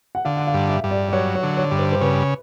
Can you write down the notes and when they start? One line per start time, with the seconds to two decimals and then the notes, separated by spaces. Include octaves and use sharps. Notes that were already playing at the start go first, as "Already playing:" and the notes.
0.15 F#5
0.25 D3 F5
0.36 F#5
0.47 F5
0.54 G2
0.69 E5
0.84 G2
0.91 D5
1.09 D5
1.13 F#3 C#5
1.35 C#5
1.43 D3
1.57 C#5
1.71 G2
1.79 C5
1.92 C5
2.01 C#3 B4